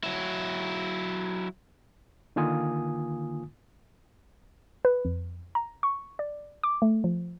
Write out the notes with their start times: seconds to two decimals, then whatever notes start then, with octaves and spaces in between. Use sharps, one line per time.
0.04 F#3 E4
2.36 D3 D#3 A#3 F4 G#5 D#6
4.85 B4
5.05 F2
5.55 A#5
5.83 C#6
6.19 D5
6.64 D6
6.82 A3
7.04 F3